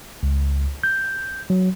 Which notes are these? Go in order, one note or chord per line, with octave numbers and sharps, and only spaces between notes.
C#2
G6
F#3